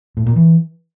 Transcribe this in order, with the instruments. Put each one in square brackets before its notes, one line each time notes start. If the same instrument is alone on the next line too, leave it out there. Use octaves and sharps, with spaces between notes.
[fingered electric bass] A2
A#2
E3